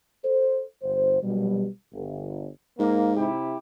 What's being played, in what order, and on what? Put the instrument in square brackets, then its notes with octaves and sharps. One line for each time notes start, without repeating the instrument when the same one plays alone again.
[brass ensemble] A4 C5
G1 C5
A#1 B2 F#3 G3
G1
[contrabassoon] G#2 [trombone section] A#3
[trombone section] C3 E4 G4